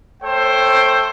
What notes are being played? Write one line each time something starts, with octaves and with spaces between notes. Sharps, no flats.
A3 A4 C5 C#5 G5